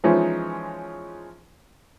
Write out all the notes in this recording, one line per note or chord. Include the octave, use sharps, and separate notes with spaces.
E3 F3 G#3 C#4 D#4